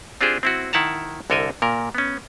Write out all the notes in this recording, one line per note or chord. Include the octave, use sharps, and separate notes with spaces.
C4 D4 F4 G4 G#4 C5
C4 E4 F#4
D#3 E4 F#5 A5 A#5
C2 D3 A4 A#4 D#5 G#5
A#2 A#4
B3 C#4